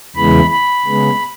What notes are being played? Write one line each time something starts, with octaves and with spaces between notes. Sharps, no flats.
E2 C#3 E3 G#3 B3 B5
B5
C#3 G#3 B3